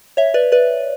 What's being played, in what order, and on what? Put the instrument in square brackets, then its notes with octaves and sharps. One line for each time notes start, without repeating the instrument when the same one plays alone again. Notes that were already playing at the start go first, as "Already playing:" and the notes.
[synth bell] C#5 E5
B4 D5
B4 D5